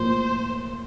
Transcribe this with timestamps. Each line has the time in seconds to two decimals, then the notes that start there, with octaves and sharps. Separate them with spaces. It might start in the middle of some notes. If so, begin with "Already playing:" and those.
Already playing: A2 F3 A#3 C5